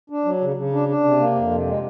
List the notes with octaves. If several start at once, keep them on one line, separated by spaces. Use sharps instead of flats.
D4
F#3
C#3
C#3
D4
D4
C3
A#3
F2
C3
G#3